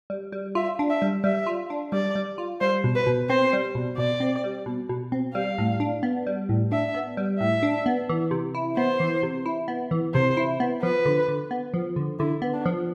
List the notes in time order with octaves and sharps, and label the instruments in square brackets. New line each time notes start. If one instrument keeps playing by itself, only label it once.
[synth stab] G3
G3
[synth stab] F4 [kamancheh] E5
[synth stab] D4
[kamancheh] E5
[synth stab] G3
[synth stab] G3 [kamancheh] E5
[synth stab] F4
D4
[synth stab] G3 [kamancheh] D5
[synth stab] G3
F4
[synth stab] G3 [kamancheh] C5
[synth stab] B2
[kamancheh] B4
[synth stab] B2
[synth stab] C4 [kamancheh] C5
[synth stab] G3
B2
[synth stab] B2 [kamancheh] D5
[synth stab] C4
G3
B2
B2
C4
[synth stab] G3 [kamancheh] F5
[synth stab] A2
D4
B3
G3
A2
[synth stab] D4 [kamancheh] E5
[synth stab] B3
G3
[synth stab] A2 [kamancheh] E5
[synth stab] D4
B3
E3
C3
E4
[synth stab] B3 [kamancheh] C5
[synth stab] E3
C3
E4
B3
E3
[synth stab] C3 [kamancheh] C5
[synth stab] E4
B3
[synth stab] F3 [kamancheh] B4
[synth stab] D3
D3
B3
F3
D3
[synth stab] D3 [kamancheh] E4
[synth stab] B3
[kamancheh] D4
[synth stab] F3